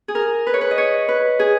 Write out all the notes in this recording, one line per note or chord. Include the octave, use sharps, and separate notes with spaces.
G#4
A#4
B4
C#5
B4
D#5
C#5
B4
G#4